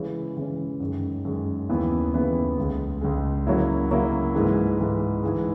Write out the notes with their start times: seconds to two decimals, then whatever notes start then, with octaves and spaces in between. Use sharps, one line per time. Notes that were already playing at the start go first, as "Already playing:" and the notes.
Already playing: C#3 E3 G#3 C#4
0.36 C#3 E3 G#3 C#4
0.80 F#2 D#3 G#3
1.25 F#2 D#3 G#3
1.69 D#2 C#3 E3 B3 E4
2.14 D#2 C#3 E3 B3 E4
2.57 C#2 C#3 G#3
3.01 C#2 C#3 G#3
3.47 C#3 F#3 A#3 E4
3.90 C#3 F#3 A#3 E4
4.35 G#2 E3 G#3
4.79 G#2 E3 G#3
5.23 G#2 E3 G#3